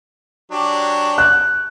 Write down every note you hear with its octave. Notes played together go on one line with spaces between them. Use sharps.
F#3 D4 G4
F#6